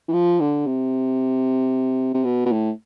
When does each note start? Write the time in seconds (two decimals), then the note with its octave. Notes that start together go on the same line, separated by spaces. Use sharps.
0.08 E3
0.13 F3
0.40 D3
0.66 C3
2.14 C3
2.25 B2
2.46 B2
2.52 A2